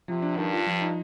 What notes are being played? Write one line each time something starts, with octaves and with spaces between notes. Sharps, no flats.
C3 F3
D4
G2 D#3
F4
F3
D#4